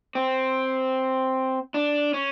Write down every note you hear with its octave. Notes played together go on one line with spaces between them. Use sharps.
C4
D4
C#4